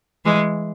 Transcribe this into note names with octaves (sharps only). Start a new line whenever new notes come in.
E3 G#3